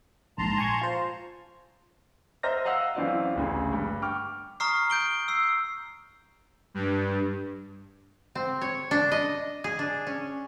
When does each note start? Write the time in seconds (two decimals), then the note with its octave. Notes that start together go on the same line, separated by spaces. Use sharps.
0.38 A#1 G#2 A5 A#5 C6
0.58 G#5 C#6 G#6
0.81 F4 C5
2.43 C5 D#5 E5 A#5 F6 A#6
2.65 D#5 F5 F#5 E6 C7
2.95 F#2 E3 C4 F4 D5 F5
3.35 A1 D2 C#3
3.73 G2
4.02 G5 C#6 D6 F6
4.60 A#5 C#6 D#6 F6 C7
4.90 G6 D7 G7
5.28 E6 C7
6.74 G2
8.35 C4
8.61 C#5
8.91 D4
9.11 D#5
9.64 G#4
9.79 D4
10.07 C#4